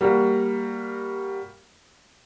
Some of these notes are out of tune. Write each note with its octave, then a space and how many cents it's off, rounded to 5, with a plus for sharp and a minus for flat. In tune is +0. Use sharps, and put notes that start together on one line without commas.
G3 +0 A#3 +0 F#4 +15